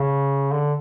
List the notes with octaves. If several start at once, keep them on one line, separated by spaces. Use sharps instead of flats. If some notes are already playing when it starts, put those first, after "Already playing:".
Already playing: C#3
D3